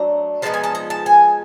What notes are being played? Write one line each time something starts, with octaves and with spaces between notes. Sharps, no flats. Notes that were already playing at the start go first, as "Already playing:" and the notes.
Already playing: F#3 A3 D4 A#5
F3 G#3 B3 D#4 A5
G#5
A5
A#5
A5
G#5